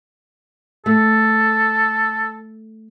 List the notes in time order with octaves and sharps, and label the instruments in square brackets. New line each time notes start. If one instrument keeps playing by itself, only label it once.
[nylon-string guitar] A3 [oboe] A4